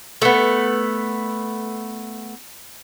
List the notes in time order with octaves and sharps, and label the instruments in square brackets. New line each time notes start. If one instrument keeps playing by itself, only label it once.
[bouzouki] A3 B3